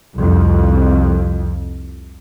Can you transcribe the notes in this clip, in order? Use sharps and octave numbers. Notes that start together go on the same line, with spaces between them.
C2 F2